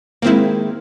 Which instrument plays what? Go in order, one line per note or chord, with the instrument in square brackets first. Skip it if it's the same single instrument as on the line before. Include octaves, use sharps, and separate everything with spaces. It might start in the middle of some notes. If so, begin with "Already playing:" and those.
[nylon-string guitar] D#3 G#3 [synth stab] A#3 C4 E4